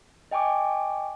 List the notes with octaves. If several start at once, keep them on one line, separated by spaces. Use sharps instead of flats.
D#5 G5 G#5 C#6 D6